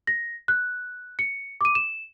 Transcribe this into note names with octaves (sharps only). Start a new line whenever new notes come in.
A#6
F#6
C#7
D6 D#7
E7